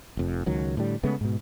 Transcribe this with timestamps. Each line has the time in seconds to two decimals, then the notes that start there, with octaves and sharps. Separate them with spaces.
0.17 F1 F2
0.46 C#2 D#3 F#3
0.77 A2 D3 G3
1.03 C#3 G#3 A3 B3
1.21 G#2 B2